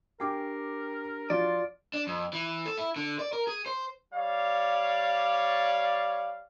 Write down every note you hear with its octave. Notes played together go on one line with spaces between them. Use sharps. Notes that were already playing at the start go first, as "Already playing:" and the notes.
D4 G4 A#4 G5 G#5 D6 C7
F3 F4 F#4 D5
D4
F2
E3
A4
E4
D3
D5
A#4
G#4
C5
G3 C#5 D5 F5